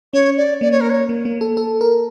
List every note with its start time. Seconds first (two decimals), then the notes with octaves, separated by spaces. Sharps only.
0.13 C#4 C#5
0.37 D5
0.61 A#3 D5
0.71 C#5
0.81 A#4
0.90 C#5
1.09 A#3
1.25 A#3
1.41 A4
1.57 A4
1.81 A#4